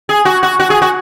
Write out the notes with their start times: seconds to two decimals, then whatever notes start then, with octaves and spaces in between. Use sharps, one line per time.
0.09 G#4
0.25 F#4
0.43 F#4
0.60 F#4
0.70 G#4
0.82 F#4